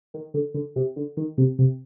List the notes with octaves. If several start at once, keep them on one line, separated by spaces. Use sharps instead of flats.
D#3
D3
D3
C3
D3
D#3
C3
C3